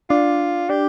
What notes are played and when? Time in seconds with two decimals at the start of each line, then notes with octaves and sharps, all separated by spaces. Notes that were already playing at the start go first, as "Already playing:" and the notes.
0.10 D4 F4
0.70 D4 G4